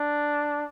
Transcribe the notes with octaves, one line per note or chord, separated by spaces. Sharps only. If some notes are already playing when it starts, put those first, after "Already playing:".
Already playing: D4